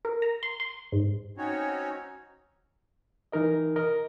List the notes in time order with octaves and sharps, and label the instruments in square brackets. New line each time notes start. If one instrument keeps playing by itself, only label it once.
[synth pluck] A#4
A#5
C6
C6
G#2
[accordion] C4 C#4 D#4 F#4 C#5
[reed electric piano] E3 D#4 A#4 D#5
A#4 D#5